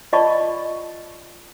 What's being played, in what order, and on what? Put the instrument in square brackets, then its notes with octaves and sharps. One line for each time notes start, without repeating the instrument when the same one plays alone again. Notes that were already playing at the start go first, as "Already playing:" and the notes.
[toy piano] F4 D5 D#5 A5 B5 C#6